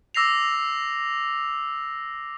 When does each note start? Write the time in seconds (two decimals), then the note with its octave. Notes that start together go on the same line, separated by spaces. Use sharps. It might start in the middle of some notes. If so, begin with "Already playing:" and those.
0.15 D6 E6 A#6 C7 F7